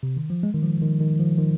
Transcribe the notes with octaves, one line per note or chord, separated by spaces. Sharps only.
C3
D#3
F3
G#3
D#3
F3
D#3
D#3
F3
D#3